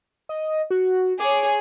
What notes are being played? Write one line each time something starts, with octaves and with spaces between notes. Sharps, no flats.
D#5
F#4
G#4 C#5 D6